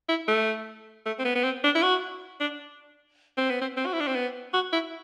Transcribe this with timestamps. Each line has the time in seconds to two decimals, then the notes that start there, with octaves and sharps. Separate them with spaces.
0.09 E4
0.28 A3
1.06 A3
1.19 C4
1.25 B3
1.35 B3
1.44 C4
1.64 D4
1.75 E4
1.83 F#4
2.41 D4
3.38 C4
3.50 B3
3.61 C4
3.77 C4
3.86 F#4
3.93 E4
4.00 D4
4.07 C4
4.15 B3
4.54 F#4
4.73 E4